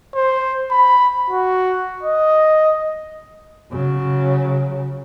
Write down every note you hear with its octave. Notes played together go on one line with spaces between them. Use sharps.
C5
B5
F#4
D#5
C#3 F#3